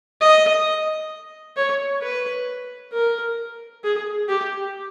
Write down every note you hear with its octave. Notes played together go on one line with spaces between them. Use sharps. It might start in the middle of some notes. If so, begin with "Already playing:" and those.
D#5
C#5
B4
A#4
G#4
G4